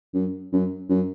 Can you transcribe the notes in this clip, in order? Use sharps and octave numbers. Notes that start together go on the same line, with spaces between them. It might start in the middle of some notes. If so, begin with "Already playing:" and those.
F#2
F#2
F#2